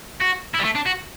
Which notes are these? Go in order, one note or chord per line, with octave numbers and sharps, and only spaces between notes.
F#4
E4
G3
A3
D4
F#4